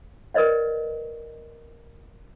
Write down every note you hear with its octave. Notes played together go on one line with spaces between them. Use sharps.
A#4 B4 D5 D#5 F#5